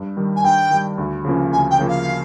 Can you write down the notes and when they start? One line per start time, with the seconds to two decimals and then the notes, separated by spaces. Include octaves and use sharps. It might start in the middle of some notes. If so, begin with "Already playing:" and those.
Already playing: G2
0.17 D#3 G3
0.36 G#5
0.44 G2 G5
0.71 D#3 G3
0.98 D2
1.25 C#3 F3 A#3 C#4
1.51 D2 G#5
1.71 G5
1.79 C#3 F3 A#3 C#4
1.88 F5